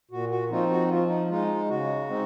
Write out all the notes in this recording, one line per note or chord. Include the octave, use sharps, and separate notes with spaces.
A#2 F#4
F#4
F3 C4 D#4 F4
F#4
F3 F4
D#4
G#3 D#4 F4
C#3 F#4
G#3 C4 D#4